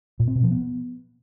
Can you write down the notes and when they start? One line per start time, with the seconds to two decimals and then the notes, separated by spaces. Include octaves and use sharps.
0.20 A#2
0.27 C4
0.35 B2
0.43 F3
0.51 B3